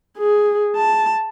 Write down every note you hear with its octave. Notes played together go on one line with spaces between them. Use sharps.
G#4
A5